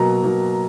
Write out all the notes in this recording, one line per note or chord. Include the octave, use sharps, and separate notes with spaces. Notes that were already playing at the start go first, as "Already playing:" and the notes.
Already playing: B2 F#3 A#3 A#5
B2 F#3 A#3